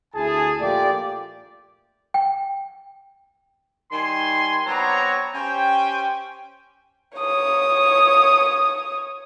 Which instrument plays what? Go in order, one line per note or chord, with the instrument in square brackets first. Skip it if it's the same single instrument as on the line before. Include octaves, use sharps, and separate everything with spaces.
[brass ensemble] D2 E4 G#4 A5
A#1 A3 A#3 F4 G4 D5
[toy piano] G5
[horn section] D#3 G3 G#5 C6
F#3 B3 C4 D4 C#5 A#5
C#4 G4 C5 G5
[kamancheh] C#5 D#6